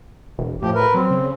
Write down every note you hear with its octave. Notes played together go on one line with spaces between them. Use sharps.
E1
A2 F3 G4
A#4 B4
F#3 C4
C#3